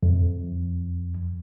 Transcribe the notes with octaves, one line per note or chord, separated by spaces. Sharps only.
F2